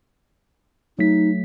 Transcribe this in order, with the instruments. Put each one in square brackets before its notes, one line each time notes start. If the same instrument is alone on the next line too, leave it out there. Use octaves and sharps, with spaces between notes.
[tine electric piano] F#3 A3 B6 [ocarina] D#4